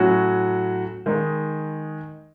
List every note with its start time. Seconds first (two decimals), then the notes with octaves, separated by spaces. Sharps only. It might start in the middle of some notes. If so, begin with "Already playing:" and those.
Already playing: A2 F#3 C#4 F#4
1.06 D#3 G#3 D#4